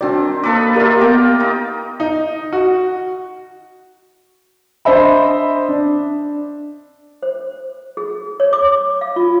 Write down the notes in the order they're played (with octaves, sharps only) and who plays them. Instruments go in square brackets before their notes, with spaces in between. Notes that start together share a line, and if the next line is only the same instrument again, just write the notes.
[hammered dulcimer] D#3 C4 [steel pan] D4 F#4 D5
[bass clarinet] A#3 [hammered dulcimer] D#4 A4 B4 [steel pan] A#5 D6
[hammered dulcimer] A#3 F4 [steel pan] G4 D5 E5 [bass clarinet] A#4
[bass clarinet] B3 [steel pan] G4 [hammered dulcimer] G5 A#5 D6
[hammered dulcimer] D#4
[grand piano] D#4
F#4
D4 C5 D#5 E5 B5
D4
[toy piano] C5
G#4
C#5
D6
F5
F4